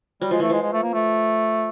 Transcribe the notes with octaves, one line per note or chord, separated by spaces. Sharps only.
F#3 G3
F3 G#3
E3 A3
F3 G#3
G#3
A3
A#3
A3